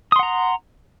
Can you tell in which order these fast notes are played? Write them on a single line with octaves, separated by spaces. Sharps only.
D#6 C6 F#5 A#5